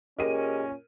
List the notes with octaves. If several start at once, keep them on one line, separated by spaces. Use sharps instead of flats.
A#2 C#4 G4 G#4 A#4 D#5 D#7